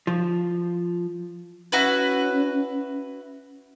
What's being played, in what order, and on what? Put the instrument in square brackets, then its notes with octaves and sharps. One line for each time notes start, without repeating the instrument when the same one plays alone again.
[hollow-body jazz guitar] F3
[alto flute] C#4 [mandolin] E4 F#4 B4